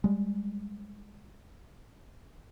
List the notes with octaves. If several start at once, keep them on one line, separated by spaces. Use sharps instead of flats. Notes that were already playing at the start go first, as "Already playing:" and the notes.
G3 G#3